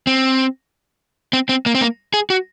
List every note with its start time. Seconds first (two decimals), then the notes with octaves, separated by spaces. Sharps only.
0.07 C4
1.33 C4
1.49 C4
1.66 A#3
1.75 C4
1.81 A#3
2.14 G#4
2.30 F#4